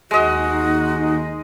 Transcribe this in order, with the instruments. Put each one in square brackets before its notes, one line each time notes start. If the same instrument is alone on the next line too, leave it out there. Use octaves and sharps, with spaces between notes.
[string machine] D#2 D#4 [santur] G#3 D#5 [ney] F#4